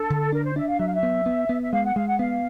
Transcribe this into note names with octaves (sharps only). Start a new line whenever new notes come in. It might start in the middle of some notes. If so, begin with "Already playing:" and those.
Already playing: D4 A4
D3
D4 A#4
C5
D4 E5
F5
F#3 E5
F5
E5
B3
B3
B3
E5
G#3 F5
F#5
G#3 F5
F#5
B3 F5